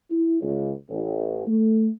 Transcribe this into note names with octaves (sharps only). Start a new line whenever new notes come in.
E4
C#2
A1
A3